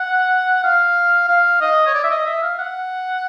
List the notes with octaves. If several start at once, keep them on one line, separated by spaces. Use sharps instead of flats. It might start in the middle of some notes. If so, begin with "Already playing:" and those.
Already playing: F#5
F5
F5
D#5
C#5
D5
E5
D#5
E5
F5
F#5